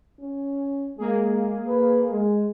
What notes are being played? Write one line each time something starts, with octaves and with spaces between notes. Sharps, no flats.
C#4
G#3 A#3 G#4
B4
G#3